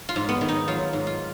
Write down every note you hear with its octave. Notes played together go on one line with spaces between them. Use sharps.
F4
G#2
B3
D#3
D#4
F#3 F4
G#2
F4